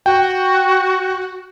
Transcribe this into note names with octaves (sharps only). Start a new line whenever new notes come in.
F#4 G5